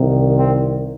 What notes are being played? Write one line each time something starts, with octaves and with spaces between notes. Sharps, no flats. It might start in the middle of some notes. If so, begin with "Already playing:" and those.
Already playing: C2 C3 D#3
C4